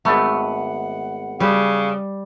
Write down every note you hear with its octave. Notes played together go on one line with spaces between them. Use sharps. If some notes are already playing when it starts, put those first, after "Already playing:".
G#1 A3 B3 F#5
C#3 G3